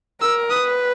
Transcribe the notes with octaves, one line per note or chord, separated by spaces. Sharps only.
A#4 E6
B4 D#6